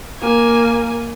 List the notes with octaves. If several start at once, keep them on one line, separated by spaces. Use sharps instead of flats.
A#3 G#5